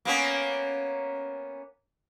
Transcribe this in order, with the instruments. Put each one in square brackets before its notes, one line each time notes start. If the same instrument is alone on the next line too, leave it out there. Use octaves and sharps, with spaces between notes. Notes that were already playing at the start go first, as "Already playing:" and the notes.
[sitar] A#3 B3 C#4